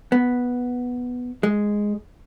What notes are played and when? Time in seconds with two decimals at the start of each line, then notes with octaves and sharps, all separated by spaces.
0.12 B3
1.43 G#3